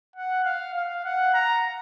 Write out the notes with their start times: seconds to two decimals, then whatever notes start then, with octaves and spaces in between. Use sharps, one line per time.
0.16 F#5
0.45 F5
0.74 F5
1.05 F#5
1.34 A#5